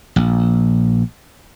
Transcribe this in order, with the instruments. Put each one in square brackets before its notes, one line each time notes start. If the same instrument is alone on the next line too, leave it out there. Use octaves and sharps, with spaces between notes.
[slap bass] A#1